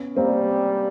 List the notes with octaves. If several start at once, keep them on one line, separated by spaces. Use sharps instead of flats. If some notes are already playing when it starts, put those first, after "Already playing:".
Already playing: B3 C#4
G3 A#3 C4